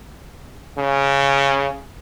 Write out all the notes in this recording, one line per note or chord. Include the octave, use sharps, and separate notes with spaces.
C#3